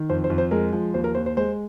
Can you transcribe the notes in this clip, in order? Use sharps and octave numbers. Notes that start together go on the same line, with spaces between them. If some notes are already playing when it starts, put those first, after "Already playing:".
Already playing: D#3
F2 C5
C5
F2
C5
G#3 A#4
F3
D#2 C5
A#4
D#2 C5
C5
G#3 C5